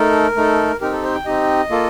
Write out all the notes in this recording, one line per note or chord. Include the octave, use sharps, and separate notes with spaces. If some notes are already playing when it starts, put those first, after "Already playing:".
Already playing: A3 D#4 A4 A#4
A3 D#4 A4
C4 D#4 G4 A#4
A4
C5
G5
C4 D#4 G4 D#5
A#3 F4 A4